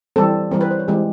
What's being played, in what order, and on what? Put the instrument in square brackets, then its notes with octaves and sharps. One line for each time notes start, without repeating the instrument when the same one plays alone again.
[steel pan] E3 G3 C4 A4
E3 G3 C4 A#4
B4
C5
C#5
E3 G#3 C4 G4